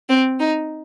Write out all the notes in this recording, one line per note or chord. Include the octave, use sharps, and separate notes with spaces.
C4
D#4